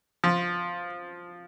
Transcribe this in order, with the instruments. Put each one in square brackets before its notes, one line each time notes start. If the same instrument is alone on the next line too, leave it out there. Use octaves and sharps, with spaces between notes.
[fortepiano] F3